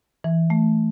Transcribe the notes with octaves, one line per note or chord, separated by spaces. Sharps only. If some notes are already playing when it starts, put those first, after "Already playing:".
E3
A3